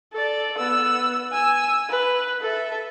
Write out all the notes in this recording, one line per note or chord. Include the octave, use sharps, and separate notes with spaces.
A4 D5
B3 E6
G#5 E6
B4
A4 E5